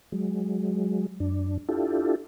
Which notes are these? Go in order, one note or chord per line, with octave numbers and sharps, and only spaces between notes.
F#3 G#3
F#2 D4
D4 E4 F4 G4 A4